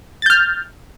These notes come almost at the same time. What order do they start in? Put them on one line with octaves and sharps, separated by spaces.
A6 G6 F6